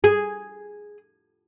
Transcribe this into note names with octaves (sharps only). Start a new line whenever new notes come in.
G#4